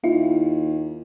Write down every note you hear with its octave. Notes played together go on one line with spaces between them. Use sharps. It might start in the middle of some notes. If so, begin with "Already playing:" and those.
D#2 E4 F4